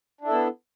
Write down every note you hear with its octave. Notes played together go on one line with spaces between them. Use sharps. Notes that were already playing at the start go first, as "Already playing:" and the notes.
B3 D4 E4 A4